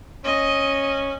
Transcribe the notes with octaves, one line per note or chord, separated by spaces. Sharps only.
C#4 D#5